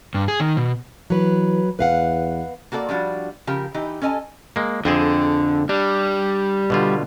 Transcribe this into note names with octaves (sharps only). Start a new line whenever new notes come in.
G2
G#4
D#3
B2
E3 F#3 B4
E2 B4 F5 F#5
A#3 F#4 A4 C5 D5
F3 G3 D4 F#4
C#3 F3 G4 A#4
E3 D#4 G4
C#4 A4 D#5 G#5 A5
G#3 A#3
F2 D3 C4 G#4
G3 D4
B2 D3 F4